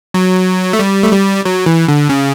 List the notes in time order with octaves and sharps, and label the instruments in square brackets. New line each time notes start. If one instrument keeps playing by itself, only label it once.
[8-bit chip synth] F#3
A3
G3
A3
G3
F#3
E3
D3
C#3